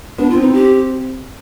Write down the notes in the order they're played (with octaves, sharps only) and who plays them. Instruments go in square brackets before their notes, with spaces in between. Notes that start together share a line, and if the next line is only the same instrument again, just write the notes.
[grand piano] B3 [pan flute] D4
[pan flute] F4
[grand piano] C4
[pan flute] D#4
G4